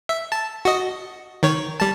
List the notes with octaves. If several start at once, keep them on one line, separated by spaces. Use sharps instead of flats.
E5
A5
F#4 D#5
D#3 C#5
G3 A5